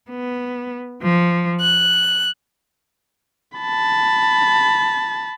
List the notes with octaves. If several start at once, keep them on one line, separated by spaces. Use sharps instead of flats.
B3
F3
F#6
A5 B5